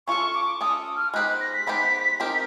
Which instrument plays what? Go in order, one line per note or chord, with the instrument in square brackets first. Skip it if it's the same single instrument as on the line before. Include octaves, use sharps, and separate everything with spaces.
[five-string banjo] C#4 F4 A4 [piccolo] C#6
[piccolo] D6
[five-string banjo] C#4 F4 A4 [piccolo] D#6
[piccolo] F6
[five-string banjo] G#3 B3 D#4 G4 C5 [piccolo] F#6
[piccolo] F#6
A#6
B6
[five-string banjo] G#3 B3 D#4 G4 C5
C4 D#4 G4 A#4